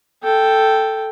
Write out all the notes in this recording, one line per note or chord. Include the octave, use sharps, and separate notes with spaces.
A4 G5